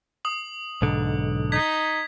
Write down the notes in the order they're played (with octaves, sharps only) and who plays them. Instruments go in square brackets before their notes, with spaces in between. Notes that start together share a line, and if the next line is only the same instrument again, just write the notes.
[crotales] D#6 F#7
[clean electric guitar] B1 G#2 D3
[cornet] D#4 [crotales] G#6 B6